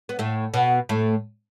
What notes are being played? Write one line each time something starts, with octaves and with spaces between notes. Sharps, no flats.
B3
A2 A3
B2 B3
A2 A3